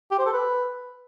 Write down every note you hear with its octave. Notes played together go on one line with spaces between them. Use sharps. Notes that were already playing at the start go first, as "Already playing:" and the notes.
G4
C5
A4
B4